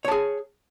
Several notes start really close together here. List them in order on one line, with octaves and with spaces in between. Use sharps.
C#5 A5 G#4